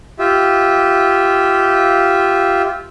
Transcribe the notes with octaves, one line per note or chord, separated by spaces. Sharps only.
F4 G4 E5